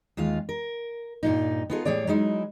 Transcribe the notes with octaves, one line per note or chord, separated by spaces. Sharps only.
D#2 G#3 F4 F5
A#4
G2 A#2 D#4
B3 D#4 F4 G#4 A4
A2 G3 G#4 C#5 D5
F#3 G#3 D#4 E4